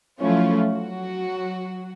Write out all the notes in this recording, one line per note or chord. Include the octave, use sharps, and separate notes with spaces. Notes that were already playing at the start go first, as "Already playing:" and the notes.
F3 F#3 A3 C#4 E4 F4
F#3 F#4